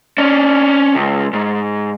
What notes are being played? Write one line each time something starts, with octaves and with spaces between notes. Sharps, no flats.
C#4 D4
C#2
G#2